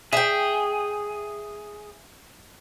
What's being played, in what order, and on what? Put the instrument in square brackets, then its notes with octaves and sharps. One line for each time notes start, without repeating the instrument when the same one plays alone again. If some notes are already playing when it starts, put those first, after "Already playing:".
[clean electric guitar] G#4 [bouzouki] E5 G5